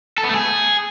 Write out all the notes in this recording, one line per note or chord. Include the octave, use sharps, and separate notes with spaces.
A4
B3
A3
G#4